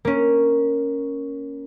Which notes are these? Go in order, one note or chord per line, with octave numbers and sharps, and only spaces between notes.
A#3 C#4